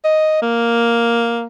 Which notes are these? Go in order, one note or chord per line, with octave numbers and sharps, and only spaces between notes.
D#5
A#3